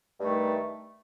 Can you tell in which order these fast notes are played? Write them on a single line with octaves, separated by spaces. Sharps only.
G2 A3 D#3